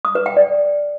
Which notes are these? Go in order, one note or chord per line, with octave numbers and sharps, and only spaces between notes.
D#6
B4
G5
D5